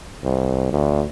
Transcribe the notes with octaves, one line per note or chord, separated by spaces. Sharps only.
C2
D2